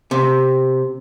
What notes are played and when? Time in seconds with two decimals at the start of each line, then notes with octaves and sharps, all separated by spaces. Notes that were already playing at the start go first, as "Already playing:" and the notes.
0.11 C3